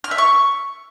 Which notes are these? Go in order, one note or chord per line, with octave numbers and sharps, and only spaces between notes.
F6
E5
C#6